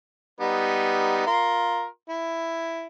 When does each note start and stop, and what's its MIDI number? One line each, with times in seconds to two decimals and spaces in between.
0.40 1.24 55
0.40 1.24 59
0.40 1.24 63
1.27 1.85 65
1.27 1.85 70
1.27 1.85 84
2.09 2.87 64